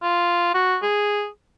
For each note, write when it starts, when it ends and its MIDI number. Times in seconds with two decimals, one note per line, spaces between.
0.02 0.52 65
0.55 0.78 66
0.83 1.28 68